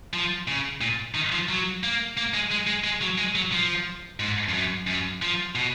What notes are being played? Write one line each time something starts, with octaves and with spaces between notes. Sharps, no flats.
F3
C#3
A#2
D#3
F3
F#3
A#3
A#3
G#3
G#3
G#3
G#3
F#3
G#3
F#3
F3
G#2
F2
F#2
F#2
F3
B2